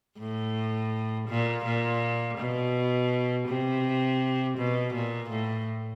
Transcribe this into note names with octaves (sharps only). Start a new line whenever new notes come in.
A2
A#2
A#2
B2
C3
B2
A#2
A2